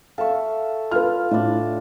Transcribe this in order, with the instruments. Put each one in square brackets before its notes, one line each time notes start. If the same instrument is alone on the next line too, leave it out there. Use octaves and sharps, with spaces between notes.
[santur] A4 E5 C#6 [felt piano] F5
[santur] F4 [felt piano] B4 F6
[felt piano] A2 [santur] D4 D5